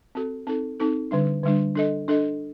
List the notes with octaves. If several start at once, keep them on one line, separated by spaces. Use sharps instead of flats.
C4 F#4 A4
C4 D#4 A4
C4 D#4 A4
D3 G3 D4
D3 G3 D4
D4 A4 D#5
D4 A4 D#5